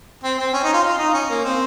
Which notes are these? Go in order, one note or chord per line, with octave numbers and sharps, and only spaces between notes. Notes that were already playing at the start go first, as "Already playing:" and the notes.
C4
C4
C#4
D#4
F4
F4
D#4
C#4
A#3
C4